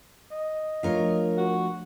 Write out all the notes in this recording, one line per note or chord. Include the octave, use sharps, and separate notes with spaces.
D#5
F3 A3 D4 F4 A#4 C#5
F#4